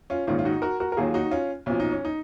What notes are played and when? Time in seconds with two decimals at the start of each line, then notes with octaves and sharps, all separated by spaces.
0.10 C#4 F4
0.27 A#1 G#2 D#3 C#4 F4
0.39 F4
0.45 D#4 F#4
0.62 F#4 A#4
0.80 F#4 A#4
0.92 A#4
0.97 D#2 D#3 F#3 F4 G#4
1.14 D#4 F#4
1.31 C#4 F4
1.66 B1 A#2 F3 C#4
1.80 D#4
1.92 C#4
2.05 D#4